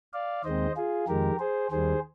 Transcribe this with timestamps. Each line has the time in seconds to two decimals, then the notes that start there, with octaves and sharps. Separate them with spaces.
0.13 D5 F5
0.44 D#2 D#3 G#3 C4 C5 D#5
0.76 F4 G#4
1.08 F2 D#3 G#3 G4 A#4
1.40 G#4 C5
1.71 D#2 D#3 G3 G#4 C5